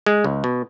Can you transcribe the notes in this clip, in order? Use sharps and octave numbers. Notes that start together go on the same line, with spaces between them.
G#3
C#2
B2